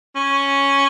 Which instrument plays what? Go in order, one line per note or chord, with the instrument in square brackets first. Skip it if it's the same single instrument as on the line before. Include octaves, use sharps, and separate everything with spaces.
[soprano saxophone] C#4